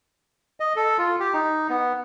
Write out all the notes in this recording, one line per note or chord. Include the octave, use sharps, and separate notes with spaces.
D#5
A4
F4
G4
D#4
B3